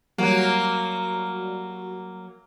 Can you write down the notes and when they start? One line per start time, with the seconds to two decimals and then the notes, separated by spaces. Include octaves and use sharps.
0.18 F#3 G3 A#3 F#4